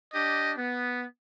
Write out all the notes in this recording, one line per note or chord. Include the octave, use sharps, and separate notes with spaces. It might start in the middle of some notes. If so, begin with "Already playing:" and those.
D4 G4 D#5
B3